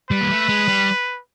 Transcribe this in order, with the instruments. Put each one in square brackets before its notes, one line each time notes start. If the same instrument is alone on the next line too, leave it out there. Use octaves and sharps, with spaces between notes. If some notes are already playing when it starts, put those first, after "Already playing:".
[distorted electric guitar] G3 [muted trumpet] B4
[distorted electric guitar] A#3
A3
G#3
G3